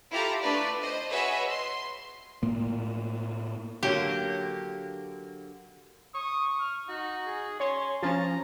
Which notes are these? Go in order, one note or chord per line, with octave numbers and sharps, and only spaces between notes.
E4 F4 G4 A4 F5 A#5
A3 D4 B4 D5
C5 D#5
F#4 G#4 B4 C#5 D#5 E5
C6
A2 A#3
D3 F#3 A#3 G4
C#6 D#6
F6
D#4 F#4
G#4
C#4 C#5 C6
F3 C#4 A5 A#5